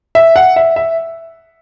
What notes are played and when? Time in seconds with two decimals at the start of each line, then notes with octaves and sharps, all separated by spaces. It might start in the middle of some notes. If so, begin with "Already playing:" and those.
0.15 E5
0.36 F#5
0.56 E5
0.76 E5